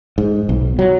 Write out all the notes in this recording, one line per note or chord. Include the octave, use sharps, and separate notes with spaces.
G#2
B1
F#3